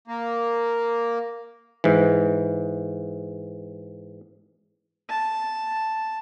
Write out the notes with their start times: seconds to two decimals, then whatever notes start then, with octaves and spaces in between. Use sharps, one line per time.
0.08 A#3
1.84 G#2 E3
5.10 A5